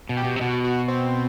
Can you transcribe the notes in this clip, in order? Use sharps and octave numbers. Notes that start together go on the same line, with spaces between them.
B2
G4
B2
C3
B2 F#4
F#4
C4